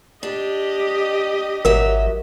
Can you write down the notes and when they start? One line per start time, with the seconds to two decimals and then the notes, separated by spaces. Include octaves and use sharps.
0.23 D4 G4 D#5
1.65 G#1 F#3 A#4 E5